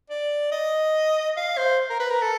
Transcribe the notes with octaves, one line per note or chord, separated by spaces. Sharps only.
D5
D#5
F5
C5
A#4
B4
A#4
A4